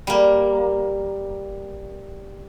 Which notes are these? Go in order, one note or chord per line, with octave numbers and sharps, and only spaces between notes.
G3 A#3